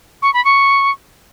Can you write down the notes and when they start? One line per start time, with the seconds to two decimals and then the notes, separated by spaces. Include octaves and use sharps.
0.22 C#6
0.34 B5
0.45 C#6